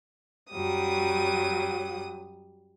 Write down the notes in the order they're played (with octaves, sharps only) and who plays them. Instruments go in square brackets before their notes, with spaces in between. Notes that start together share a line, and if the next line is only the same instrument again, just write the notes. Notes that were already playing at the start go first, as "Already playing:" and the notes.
[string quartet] F#2 F#3 G3 D#6